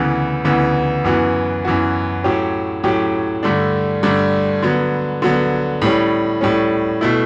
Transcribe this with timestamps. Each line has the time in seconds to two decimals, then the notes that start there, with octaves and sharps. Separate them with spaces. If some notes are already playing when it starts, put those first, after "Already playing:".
Already playing: D2 C#3 E3 B3
0.45 D2 C#3 E3 B3
1.04 F#2 E3 B3 F#4
1.65 F#2 E3 B3 F#4
2.24 A2 F#3 C#4 G4
2.84 A2 F#3 C#4 G4
3.43 G2 D3 A3 D4
4.03 G2 D3 A3 D4
4.62 D3 F#3 B3
5.22 D3 F#3 B3
5.82 A2 G3 C#4
6.41 A2 G3 C#4
7.01 B2 A3 E4